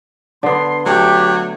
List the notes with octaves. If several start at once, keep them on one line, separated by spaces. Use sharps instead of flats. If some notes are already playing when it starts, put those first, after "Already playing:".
D3 B3 C6
F#3 A3 G4